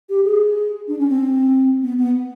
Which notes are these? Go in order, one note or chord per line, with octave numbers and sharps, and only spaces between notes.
G4
G#4
D4
C#4
C4
B3
B3